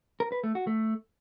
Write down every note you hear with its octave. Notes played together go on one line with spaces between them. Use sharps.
A#4
B4
A3
F#4
A3